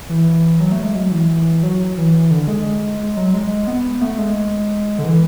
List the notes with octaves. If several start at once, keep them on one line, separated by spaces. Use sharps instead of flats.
E3
F#3
A3
G#3
F#3
E3
F#3
E3
D3
G#3
G#3
F#3
G#3
B3
A3
G#3
D3
E3